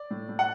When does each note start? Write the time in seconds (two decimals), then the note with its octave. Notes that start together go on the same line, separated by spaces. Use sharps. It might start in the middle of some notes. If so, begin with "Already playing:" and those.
Already playing: D5
0.11 A2
0.29 A2
0.39 F#5